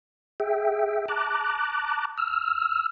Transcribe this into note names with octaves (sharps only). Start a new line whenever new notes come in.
G#4 E5 G5
A5 A#5 D6 F#6
E6 F6